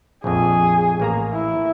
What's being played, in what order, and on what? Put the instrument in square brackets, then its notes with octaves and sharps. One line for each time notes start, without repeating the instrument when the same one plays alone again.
[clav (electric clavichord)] A#1 F2 [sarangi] G#4
[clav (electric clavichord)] A1 A#3 A#5
[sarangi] E4